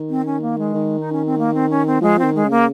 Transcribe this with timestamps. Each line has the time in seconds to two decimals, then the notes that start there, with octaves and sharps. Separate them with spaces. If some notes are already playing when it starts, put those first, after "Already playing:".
Already playing: D#3
0.09 C4
0.26 C#4
0.42 A#3
0.58 G#3
0.74 D#3
1.00 D#4
1.12 C#4
1.25 C4
1.38 A#3
1.54 C4
1.70 C#4
1.86 C4
2.02 F3 G#3
2.19 D#3 C4
2.35 G#3
2.44 C#3
2.50 A#3